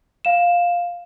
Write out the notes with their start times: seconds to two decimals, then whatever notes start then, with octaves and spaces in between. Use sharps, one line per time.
0.25 F5 E7